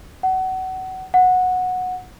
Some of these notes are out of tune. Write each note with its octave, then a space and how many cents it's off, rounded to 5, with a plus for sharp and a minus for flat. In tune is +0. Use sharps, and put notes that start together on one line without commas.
F#5 +25
F#5 -15